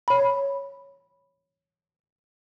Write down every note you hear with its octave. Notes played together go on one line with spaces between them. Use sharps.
C#5 B5